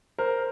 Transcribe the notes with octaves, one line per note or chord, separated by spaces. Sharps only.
A#4 C5